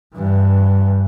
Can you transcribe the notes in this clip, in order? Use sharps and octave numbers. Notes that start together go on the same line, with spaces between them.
G2 E3